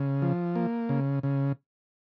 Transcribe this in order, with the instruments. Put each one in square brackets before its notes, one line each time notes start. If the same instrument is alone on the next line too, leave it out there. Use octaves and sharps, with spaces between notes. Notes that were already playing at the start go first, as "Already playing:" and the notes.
Already playing: [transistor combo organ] C#3
F3
A#3
C#3
C#3